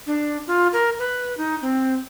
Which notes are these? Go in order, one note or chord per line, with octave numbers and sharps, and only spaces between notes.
D4
F4
A#4
B4
D#4
C4